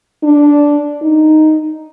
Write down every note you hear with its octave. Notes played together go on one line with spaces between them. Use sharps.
D4
D#4